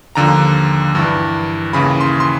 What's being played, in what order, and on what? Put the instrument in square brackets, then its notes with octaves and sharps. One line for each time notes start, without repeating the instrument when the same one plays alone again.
[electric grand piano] D#2 D3 F3 A#5
G2 E3
D#2 C#3 E3 B5
C6
C6